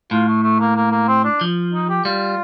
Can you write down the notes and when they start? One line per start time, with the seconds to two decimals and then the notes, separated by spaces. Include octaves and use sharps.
0.11 A2 F4
0.28 A3
0.43 A3
0.60 A#3
0.76 A#3
0.91 A#3
1.08 C4
1.24 D4
1.41 F3
1.73 D#4
1.89 G4
2.05 G3 F4